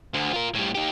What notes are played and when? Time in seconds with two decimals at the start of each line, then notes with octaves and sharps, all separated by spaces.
0.14 D2 D3
0.33 F4 A#4
0.55 A2 G3
0.75 D#4 G4